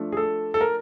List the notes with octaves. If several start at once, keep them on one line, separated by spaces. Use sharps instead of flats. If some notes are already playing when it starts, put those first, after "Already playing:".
Already playing: F3 A3 D4
G#4
A4
A4
A#4